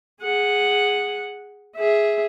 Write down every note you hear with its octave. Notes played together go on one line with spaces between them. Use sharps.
G#4 F#5
G#4 E5